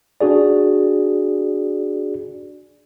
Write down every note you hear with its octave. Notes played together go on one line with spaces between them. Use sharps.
D4 F#4 G#4 D5